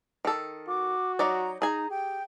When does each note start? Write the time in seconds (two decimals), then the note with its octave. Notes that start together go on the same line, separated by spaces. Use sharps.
0.25 D#3 A4
0.68 F#4 D6
1.19 F#3 D#4 D5 A#5
1.62 D#4 G#4 G#5 A#5
1.91 G4 G5